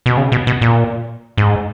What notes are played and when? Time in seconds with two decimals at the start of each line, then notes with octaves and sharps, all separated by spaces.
0.06 B2
0.17 C#3
0.32 B2
0.47 B2
0.61 A#2
1.37 G#2